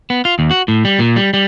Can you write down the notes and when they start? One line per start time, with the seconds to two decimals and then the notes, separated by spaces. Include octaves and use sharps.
0.10 B3
0.25 F4
0.39 D#2
0.51 F#4
0.68 A2
0.85 G3
0.99 A#2
1.16 G3
1.34 G3